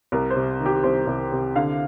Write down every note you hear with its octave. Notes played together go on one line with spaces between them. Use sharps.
C2 A#4
C5
C3
D#3
G4
C2 C5
C2
C3
D3 F5